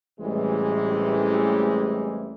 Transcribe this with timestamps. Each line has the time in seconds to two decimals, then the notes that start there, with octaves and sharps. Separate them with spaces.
0.20 A1 A2 C3 E3 G3 G#3